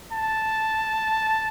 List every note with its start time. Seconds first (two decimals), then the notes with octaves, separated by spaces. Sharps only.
0.13 A5